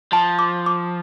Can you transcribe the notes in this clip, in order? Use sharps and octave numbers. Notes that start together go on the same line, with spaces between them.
F3 A5
D6
D6